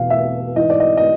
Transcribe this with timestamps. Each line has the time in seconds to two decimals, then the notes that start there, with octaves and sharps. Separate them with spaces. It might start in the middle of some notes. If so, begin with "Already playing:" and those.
Already playing: E2 B2 F5
0.10 E5
0.56 G#2 E3 D#5
0.70 D5
0.80 D#5
0.97 D#5